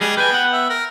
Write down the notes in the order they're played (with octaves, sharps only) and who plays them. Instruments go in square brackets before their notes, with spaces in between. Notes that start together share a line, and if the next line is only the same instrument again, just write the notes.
[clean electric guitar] G3 G#3 G4 [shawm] G#4
[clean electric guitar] B4 G#5 [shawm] G5
[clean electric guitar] B3 F#5
[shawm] E5
A#4